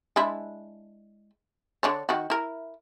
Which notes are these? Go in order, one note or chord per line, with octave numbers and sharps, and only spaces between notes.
G#3 D4 E4
D3 D4 C#5
D#3 F#4
E4 A#4